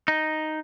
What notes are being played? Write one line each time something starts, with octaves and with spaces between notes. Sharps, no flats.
D#4